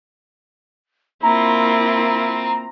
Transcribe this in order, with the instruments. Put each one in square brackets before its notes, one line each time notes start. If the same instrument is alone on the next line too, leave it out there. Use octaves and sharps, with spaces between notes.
[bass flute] A#3 [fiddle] C4 F4 [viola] E4 [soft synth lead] A#5